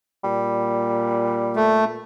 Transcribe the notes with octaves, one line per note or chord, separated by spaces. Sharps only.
A#2 G3
A3